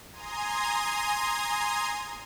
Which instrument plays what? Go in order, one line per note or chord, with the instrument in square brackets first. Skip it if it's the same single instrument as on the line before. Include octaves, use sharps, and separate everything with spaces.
[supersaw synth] G#5 A#5 C6 D#6 G#6